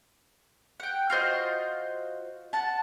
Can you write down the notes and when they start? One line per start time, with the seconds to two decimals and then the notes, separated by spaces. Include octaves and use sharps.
0.80 F#5 G5
1.10 F4 F#4 C5 D#5
2.53 F#5 A5